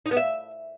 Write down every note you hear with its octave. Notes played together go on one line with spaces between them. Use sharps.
D#4
B3
E5